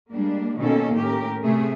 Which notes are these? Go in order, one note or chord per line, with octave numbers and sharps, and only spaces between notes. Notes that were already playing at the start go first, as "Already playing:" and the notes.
G3 G#3 A#3 D4
B2 D#3 A#3 C#4 D#4 A4
A2 C#4 G4 A#4
C3 A3 G#4